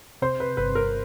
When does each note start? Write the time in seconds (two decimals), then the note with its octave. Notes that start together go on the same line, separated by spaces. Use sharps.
0.22 C3 C5
0.40 B4
0.57 G1 B4
0.75 A#4